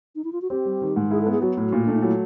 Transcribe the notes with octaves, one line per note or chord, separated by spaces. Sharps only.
D#4
E4
F4
F#4
C4 G4
G3
D#3
G#2
E4 G#4
A4
B3
G#4
F#3 F#4
A2
A#2
A3 D4
D#4
F#3 E4